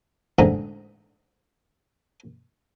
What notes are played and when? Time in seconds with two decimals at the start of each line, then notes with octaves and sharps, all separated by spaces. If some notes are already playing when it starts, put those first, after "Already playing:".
0.39 A1 G#2 D3 E3 D#4 A#5